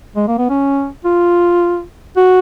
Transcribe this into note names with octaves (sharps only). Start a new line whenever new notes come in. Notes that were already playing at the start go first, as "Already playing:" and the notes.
G#3
A#3
B3
C#4
F4
F#4